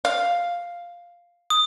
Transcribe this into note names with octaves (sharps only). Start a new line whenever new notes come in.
F5
D#6